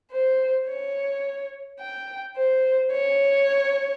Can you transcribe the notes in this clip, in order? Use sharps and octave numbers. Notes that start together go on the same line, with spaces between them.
C5
C#5
G5
C5
C#5